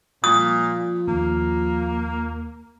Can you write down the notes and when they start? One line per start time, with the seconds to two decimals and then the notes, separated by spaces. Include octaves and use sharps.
0.24 A#2 F3 D#6
1.08 D#2 A#3